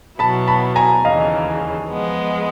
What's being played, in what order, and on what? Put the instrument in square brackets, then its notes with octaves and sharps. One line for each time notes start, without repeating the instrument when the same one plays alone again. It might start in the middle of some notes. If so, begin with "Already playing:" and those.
[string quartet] B2 F#3 B3 E4 [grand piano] A5 B5
[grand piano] A5 B5
G#5 A#5
[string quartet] D#2 C#3 E3 [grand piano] D#5 F5
[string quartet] F3 G#3 B3